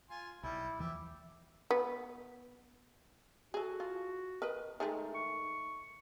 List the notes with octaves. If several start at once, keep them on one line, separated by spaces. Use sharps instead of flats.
F4 G#5 C6
B1 G3 E4
D#2 E3 F3 G4 E5
B3
F#4 G#4 A4
F4
A#4 B4 D#5
D#3 G#3 A3 D#4
C#6